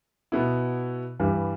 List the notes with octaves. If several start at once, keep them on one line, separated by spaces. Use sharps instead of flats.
B2 B3 E4
G2 E3 G3